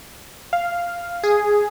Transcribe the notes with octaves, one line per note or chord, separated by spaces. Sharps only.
F5
G#4